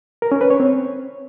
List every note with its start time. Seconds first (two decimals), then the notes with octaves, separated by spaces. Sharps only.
0.22 A#4
0.32 C#4
0.41 B4
0.50 C#5
0.60 C4